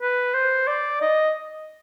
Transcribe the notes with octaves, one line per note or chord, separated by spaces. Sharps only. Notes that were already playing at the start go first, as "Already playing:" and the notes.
B4
C5
D5
D#5